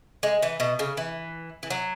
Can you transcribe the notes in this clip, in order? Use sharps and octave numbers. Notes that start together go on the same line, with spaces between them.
G#3
E3
B2
C#3
E3
E3
F#3